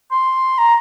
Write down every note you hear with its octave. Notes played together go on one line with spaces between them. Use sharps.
C6
A#5